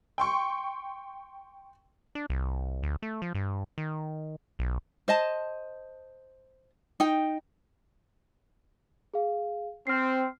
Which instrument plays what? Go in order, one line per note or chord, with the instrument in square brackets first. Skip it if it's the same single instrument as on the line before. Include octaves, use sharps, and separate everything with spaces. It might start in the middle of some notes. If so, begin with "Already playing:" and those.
[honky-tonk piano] G5 C6 C#6
[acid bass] D4
C2
D2
A3
F3
G2
D#3
B1
[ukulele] C5 D#5 A5
D#4 G5
[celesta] G#4 F5
[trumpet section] C4 [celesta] F6 C7